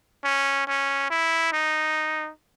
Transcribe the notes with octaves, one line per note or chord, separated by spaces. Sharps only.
C#4
C#4
E4
D#4